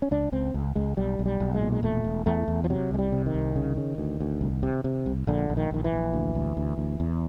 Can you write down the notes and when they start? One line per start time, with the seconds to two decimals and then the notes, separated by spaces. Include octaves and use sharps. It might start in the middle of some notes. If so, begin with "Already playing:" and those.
0.02 C#4
0.11 C#2 D4
0.32 C#2 C4
0.54 C#2
0.75 C#2 G#3
0.97 B1 G3
1.19 B1
1.26 G3
1.40 B1
1.54 G#3
1.61 A#2
1.72 G#3
1.83 E1 A3
2.04 E1
2.26 E2 A3
2.48 E2
2.64 F3
2.70 C3 F#3
2.91 C2 G#3
2.99 G3
3.12 C3
3.26 D#3
3.34 C2
3.56 C#3
3.77 C#3
3.98 D2
4.20 D2
4.41 C2
4.63 C3
4.84 C3
5.06 C2
5.27 A#1 D3
5.50 A#1
5.57 D#3
5.71 A#1 D#3
5.84 E3
5.92 A#1
6.13 D2
6.35 D2
6.57 D2
6.78 D2
7.00 E2